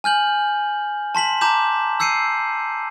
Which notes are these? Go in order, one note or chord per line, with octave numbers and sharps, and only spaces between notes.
G#5 F6 G6 F#7
A5 C6 B6 F#7
A5 A#5 D6 G6 E7
E6 G6 C7 C#7 D#7